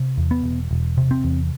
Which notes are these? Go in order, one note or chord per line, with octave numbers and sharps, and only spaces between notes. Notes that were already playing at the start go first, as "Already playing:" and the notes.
Already playing: C3
E2
B3
E1
E1
C3
C4
E2